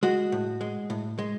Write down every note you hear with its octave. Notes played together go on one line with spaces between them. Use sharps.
G#3 F#4
A2
G#3
A2
G#3